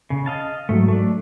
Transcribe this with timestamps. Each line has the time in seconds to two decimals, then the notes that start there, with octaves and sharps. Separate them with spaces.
0.10 C#3
0.26 D#5 F5 A5
0.69 G#2 F#3 A3
0.88 A3 D4